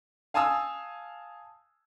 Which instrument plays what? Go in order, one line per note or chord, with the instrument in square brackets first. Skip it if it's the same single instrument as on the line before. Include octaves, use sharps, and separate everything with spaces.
[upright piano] F5 G#5 A5 D#6 E6